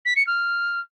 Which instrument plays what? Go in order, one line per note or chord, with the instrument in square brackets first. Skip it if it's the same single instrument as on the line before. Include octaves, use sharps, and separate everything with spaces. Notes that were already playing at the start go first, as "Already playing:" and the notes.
[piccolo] B6
C#7
F6